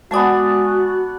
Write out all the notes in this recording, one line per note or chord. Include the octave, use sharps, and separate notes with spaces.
G#3 B3 F#4 D5 G#5 A5 D#6